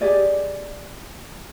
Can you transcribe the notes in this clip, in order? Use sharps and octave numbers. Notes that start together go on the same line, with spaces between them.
G4 G#4 D5 D#5